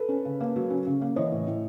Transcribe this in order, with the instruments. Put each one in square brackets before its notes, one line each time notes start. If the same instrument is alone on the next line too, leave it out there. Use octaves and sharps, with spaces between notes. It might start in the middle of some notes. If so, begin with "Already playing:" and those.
Already playing: [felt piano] A4 B4
C#4
C#3
A#3
F#3
C#4
C#3
A#3
E3 C#5 D#5
A2
A2